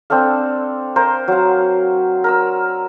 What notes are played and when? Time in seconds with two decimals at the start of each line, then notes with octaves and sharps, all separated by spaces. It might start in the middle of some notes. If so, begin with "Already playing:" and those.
0.10 C4 D4 A4 F5
0.96 A#4 C5 F5 A#5
1.28 F#3 F5
2.24 A#4 A#5 E6